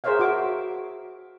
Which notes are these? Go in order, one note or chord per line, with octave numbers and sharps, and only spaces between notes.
G#4 A#4 C5 C#5 E5 F5
F#4 E5 D6